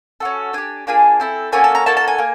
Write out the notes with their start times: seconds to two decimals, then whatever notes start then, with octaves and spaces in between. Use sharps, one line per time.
0.20 C#4 F#4 A4
0.53 D4 G4 G#5
0.87 A#3 D4 F4 G#4 G#5
1.20 C4 E4 A4
1.52 A#3 C#4 F#4 A4 G#5
1.64 A5
1.75 A#5
1.86 A#3 D#4 F#4 A4 A5
1.97 A5
2.08 G#5
2.19 A#3